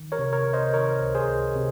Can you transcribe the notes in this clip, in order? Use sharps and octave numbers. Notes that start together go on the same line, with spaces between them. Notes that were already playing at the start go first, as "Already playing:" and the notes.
Already playing: D#3
A#4 C#5
C3
A#4 C#5
C3
C5 D#5
D#3 A#4 C#5
C#2
G#4 C5
C#2
C3